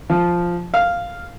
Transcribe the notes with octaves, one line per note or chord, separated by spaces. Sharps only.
F3
F5